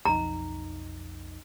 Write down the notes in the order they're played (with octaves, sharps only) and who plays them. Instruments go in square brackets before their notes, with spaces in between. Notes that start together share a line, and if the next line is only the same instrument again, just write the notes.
[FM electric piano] B1 F2 D#4 [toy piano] A#5